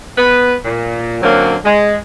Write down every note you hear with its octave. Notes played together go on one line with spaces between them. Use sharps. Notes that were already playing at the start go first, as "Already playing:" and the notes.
B3 B4
A#2
D3 F#3 A#3 C4 C#4
G#3